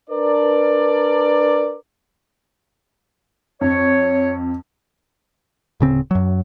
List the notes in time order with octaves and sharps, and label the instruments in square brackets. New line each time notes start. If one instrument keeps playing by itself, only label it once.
[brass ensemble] D4 A#4 B4 D5
[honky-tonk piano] F2 [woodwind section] C#5
[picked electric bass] D1 C#3 C4
F#2 F#3